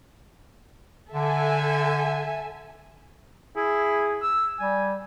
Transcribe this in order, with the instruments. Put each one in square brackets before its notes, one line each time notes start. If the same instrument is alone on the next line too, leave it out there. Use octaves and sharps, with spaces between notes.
[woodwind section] D3 [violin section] A4 E5 G#5
[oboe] E4 [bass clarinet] G#4
[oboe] E6
[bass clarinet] G3 [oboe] G#5